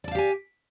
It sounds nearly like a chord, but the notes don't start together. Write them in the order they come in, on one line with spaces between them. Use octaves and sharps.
D5 A5 F5 G4 G#5